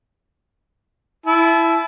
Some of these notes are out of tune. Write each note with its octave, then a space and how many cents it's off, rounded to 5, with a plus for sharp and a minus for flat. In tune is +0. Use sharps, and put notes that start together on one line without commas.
E4 +10 A5 -35